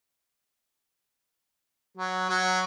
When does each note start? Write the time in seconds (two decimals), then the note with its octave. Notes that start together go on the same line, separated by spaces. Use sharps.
1.97 F#3
2.29 F#3